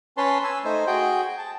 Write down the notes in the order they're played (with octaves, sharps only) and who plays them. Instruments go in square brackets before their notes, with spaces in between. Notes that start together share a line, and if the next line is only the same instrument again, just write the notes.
[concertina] C#4 B4 C#5 A5 C6
G#5 E6
A3 D#4 C5
F#4 G#4 G5
A5